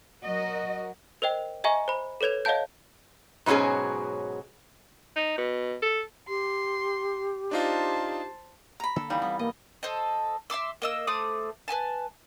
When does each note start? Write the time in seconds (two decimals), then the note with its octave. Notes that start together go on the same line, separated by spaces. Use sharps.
0.23 F#3 F#4 A#4 D#5
1.22 A#4 C5 D#5 G5
1.64 D#5 E5 G#5 A#5 C#6
1.88 C5 B5
2.21 A4 B4 C#5 G#6 F7
2.45 C#5 D#5 F5 F#5 A5 G6
3.46 G#2 B2 F#3 C#4 G#4
5.16 D#4
5.38 B2
5.82 A4
6.28 G4 C6
7.51 D4 D#4 F4 C5 A5
8.80 A#5 B5
8.96 D3 A#3 D4 A4
9.10 E3 G3 D#4 F5
9.22 G3 B3 C4
9.39 B1 A#3 D#5
9.83 A4 C5 D#5
10.50 E5 C6 D6 E6
10.82 A#3 D#5 E6
11.07 A3 C5 D6 D#6
11.68 B4 D#5 G#5 A5